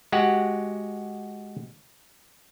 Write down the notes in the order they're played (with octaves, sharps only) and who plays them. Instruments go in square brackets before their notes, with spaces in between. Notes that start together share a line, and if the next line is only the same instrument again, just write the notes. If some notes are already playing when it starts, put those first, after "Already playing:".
[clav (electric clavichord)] G#3 F#4 G4 F#5